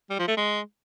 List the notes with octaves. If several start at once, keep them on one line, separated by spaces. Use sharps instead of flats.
G3
F3
A3
G#3